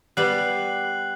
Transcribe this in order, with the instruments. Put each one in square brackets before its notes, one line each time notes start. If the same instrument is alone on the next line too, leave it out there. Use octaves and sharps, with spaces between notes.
[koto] G3 B3 [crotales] F#6 C7 F#7